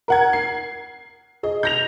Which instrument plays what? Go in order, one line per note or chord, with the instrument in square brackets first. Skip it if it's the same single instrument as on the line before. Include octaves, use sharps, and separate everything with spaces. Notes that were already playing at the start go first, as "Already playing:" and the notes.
[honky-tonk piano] A#4 F#5 G#6
C7
G#4 D#5
G6 A#6 F7